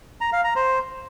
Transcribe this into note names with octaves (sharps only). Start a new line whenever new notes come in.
A#5
F5
A#5
C5